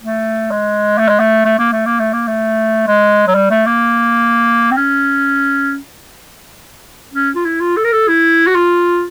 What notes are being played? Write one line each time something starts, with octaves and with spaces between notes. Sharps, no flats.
A3
G#3
A3
G#3
A3
A3
A#3
A3
A#3
A3
A#3
A3
G#3
F#3
G3
A3
A#3
C4
C#4
C#4
F4
E4
F4
A4
A#4
A4
E4
F#4
F4